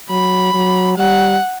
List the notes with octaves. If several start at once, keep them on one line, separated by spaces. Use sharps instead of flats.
F#3 B5
F#3
G3 F#5